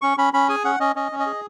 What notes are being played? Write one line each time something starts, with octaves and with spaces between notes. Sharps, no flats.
C#4 C#6
C#4 B5
C#4 B5
G#4 G#5
C#4 F#5
C#4 D#5
C#4 D#5
C#4
D#5
G#4